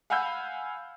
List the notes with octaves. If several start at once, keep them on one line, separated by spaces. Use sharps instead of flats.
F5 F#5 G#5 B5 E6 G6